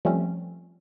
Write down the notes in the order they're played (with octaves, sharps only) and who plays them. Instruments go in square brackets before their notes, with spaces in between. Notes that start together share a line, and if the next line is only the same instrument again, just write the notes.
[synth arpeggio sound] F3 G3 A3 C4 C#4